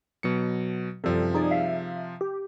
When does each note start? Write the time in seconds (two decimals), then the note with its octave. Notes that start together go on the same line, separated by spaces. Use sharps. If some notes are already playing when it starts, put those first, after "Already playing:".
0.23 B2 F#3 C#7
1.04 F#2 C3 F3 G3 A4
1.34 D#4 G#4 D5
1.51 E5 F5
2.21 G4